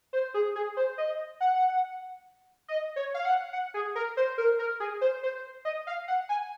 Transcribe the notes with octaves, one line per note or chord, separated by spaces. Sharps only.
C5
G#4
G#4
C5
D#5
F#5
D#5
C#5
F5
F#5
F#5
G#4
A#4
C5
A#4
A#4
G#4
C5
C5
D#5
F5
F#5
G#5